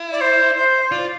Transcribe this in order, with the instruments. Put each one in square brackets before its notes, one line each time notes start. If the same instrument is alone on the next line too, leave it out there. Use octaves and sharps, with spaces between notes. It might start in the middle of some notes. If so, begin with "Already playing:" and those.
Already playing: [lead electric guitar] E4
[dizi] D5
C5
C5
[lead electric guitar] F4 [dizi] D5